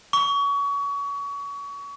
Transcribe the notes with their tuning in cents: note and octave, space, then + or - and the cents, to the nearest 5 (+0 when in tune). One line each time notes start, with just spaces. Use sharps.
C#6 +30